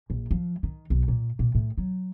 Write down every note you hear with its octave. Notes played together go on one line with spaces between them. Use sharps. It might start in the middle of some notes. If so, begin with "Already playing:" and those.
A#1
F3
D#3
B1
A#2
A#2
A2
F#3